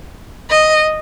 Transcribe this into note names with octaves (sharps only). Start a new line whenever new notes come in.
D#5